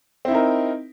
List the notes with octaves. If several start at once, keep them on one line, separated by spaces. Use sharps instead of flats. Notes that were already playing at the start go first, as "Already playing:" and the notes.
C4 D#4 E4 A#4